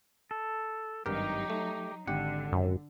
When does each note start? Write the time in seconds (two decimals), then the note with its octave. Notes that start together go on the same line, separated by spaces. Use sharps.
0.31 A4
1.06 G#1 G2 F#3 D#4 G4 A#4
1.50 A3
2.07 G#1 D3 G4 F#5
2.53 F#2